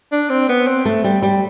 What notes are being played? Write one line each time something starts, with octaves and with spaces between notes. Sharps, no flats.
D4
C4
B3
C4
A3
G3
G3